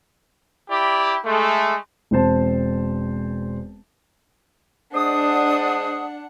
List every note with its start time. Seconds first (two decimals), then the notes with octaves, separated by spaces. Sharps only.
0.70 E4 G4 D5
1.24 G#3 A3
2.11 E1 C4 C5 A5
4.95 G#3 D4 C5 F#5 D#6